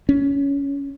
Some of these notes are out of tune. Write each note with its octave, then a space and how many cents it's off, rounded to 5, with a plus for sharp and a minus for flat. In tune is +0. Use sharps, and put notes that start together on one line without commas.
C#4 +15